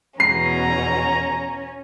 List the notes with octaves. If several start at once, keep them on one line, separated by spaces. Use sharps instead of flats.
E2 B2 C#4 A#5 C7